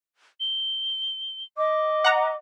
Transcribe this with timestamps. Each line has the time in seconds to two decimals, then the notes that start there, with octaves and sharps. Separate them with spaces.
0.40 G7
1.57 D#5 D6
2.04 F#5 A#5